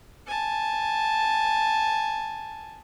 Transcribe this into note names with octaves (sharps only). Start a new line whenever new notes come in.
G#5 A5